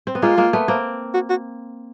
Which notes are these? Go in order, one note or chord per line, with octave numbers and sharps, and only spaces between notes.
C4
B3
G#3 A#3 F4
G#3 A#3
A3 B3
A#3 C4
F#4
F#4